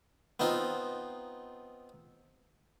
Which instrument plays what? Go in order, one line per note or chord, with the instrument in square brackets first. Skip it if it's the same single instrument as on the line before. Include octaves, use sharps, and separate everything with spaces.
[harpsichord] B3 C4 D#4 F4